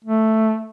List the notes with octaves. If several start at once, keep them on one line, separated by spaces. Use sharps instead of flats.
A3